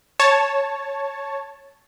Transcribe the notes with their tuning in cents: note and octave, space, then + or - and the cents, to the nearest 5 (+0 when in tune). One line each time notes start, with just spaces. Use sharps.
C#5 +0 A5 +0